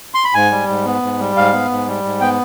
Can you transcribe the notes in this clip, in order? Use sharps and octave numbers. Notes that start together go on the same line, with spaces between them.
C6
B5
G#2 G#5
G3
G#2
B3
G#2
G3
G#2 F5
B3
G#2
G3
G#2
B3 G5